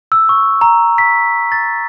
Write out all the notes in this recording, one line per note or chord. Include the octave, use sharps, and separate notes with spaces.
E6
C#6
A#5
B6
A6